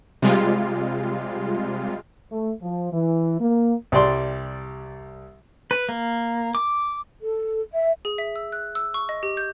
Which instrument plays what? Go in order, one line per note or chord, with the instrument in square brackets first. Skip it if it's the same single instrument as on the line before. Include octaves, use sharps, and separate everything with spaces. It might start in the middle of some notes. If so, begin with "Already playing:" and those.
[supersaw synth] C3 G3 G#3 F4
[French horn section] A3
F3
E3
A#3
[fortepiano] C2 G3 D5 C6
[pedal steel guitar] B4
A#3
D6
[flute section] A4
E5
[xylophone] G#4
E5
E6
F#6
E6
C#6
D#5
G4
G6